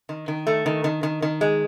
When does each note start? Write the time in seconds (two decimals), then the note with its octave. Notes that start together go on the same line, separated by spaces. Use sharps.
0.09 D#3
0.28 D#3
0.47 A3
0.66 D#3
0.84 D#3
1.03 D#3
1.22 D#3
1.41 G#3